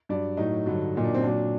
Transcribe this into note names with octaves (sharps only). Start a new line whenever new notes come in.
G2 F#3 D5
A2 F#3 D#4
G2 D3 F#3
A#2 F#3 D#4
D4
C4
A#2 F#3 D4